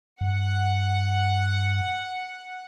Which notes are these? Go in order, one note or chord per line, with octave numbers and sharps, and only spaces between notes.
G2 F#5